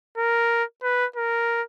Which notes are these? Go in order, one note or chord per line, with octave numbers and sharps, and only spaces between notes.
A#4
B4
A#4